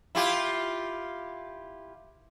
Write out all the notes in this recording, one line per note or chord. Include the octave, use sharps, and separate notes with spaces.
E4 F4 G4